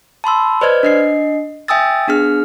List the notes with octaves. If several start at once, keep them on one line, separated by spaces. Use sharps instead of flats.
A5 B5 C6 E6
B4 C5 D5 D#5 F6 G#6
D4 D#5 C7
E5 G5 G#5 D#6 E6 A6
B3 D4 G#4 F6